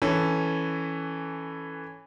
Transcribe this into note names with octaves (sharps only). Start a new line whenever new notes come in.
E3 C#4 A4 B4